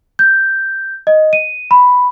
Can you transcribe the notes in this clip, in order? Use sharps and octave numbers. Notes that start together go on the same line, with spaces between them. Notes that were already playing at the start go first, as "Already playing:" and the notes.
G6
D#5
D#7
B5